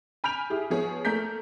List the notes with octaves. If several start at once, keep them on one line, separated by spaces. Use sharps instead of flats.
G#5 B5 F6 G6 D7 F7
E4 G4 G#4
F3 B3 G#4 C#5
A3 A#3 A#4 G6 B6